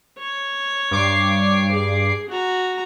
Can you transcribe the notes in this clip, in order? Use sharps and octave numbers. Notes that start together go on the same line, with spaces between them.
C#5
G2 D6 C7
G#4
F#4 A#5